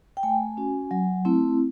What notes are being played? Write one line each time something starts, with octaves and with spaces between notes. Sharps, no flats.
G5
A3 G#5
C#4 F#4
F#3
A3 C4 E4